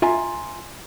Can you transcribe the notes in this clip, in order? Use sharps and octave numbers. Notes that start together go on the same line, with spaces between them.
F4 E5 G#5 A#5